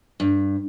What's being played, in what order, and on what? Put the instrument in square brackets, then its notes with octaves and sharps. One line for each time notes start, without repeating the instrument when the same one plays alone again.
[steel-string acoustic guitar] G2